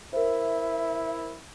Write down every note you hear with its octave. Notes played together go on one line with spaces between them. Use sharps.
E4 A#4 C5 E5